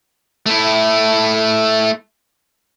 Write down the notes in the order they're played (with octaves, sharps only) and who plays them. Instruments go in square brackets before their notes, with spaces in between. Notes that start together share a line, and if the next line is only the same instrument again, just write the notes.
[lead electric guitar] A3 E4